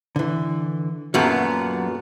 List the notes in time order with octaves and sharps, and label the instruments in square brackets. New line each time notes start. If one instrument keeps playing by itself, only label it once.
[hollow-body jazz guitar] D3 E3
[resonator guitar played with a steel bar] F#2 A#2 B3 [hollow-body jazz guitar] F#3 G4 A4